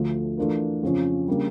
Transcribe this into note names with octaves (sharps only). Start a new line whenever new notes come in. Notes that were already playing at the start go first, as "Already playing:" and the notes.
Already playing: D2 D3 F3 A3
E3 A3 D4 F4 A#4
F2 C#3 F3 C#4
C#3 G3 A#3 D4